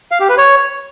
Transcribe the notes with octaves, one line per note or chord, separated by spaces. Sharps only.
F5
G4
B4
C#5